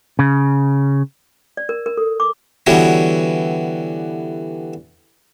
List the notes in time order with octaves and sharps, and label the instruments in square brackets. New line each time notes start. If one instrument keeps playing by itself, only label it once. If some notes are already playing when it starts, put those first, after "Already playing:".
[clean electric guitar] C#3
[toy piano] D5
A#4
A#4
A4
D6
[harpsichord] D3 E3 G3 B3 F#4 C#5